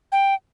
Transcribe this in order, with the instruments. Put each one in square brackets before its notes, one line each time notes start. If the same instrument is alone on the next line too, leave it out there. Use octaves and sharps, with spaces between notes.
[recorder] G5